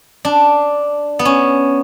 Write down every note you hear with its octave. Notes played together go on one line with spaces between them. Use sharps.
D4
B3
C#4